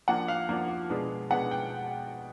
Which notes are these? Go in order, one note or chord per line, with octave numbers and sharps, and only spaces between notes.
F3 A#3 D4 F#5
F5
F3 A#3 D4
B2 G#3 B3 D4
B2 G#3 B3 D4 F#5
G5